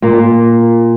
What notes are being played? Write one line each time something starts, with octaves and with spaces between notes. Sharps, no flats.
A#2 A#3